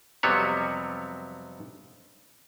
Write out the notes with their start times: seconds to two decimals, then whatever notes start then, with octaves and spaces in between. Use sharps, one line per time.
0.23 F2 C3 F#3 G3 B3 C#5